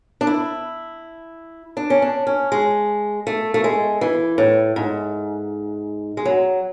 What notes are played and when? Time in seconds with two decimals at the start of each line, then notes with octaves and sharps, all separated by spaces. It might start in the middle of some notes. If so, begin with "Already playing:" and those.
0.21 D4
0.27 E4
1.77 D4
1.90 C#4
2.02 D4
2.27 C#4
2.52 G#3
3.27 A3
3.54 A3
3.64 G#3
4.01 E3
4.38 A2
4.76 G#2
6.17 G#3
6.25 F#3